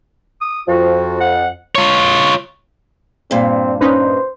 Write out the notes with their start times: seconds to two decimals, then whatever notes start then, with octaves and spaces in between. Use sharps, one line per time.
0.41 D#6
0.68 F2 F3 F#4
1.20 F#5
1.75 F4 C#5
3.31 G2 A#2 C4
3.81 C#4 D#4 B4 C5